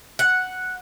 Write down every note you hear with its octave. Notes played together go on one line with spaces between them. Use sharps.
F#5